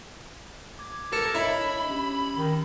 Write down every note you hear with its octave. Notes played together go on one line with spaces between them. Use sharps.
D6 G#6
A4 A#4
D4 E4 C#5 D#5 A#5 B5
C#4 G4
D#3